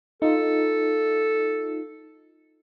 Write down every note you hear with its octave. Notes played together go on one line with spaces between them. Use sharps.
D#4 F4 A4